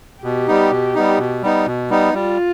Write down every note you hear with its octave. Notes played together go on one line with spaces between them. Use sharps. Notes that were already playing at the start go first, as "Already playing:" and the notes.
B2 G4
G3 B3 D#4
B2
G3 B3 D#4
B2
G3 B3 D#4
B2
G3 B3 D#4
G3 F4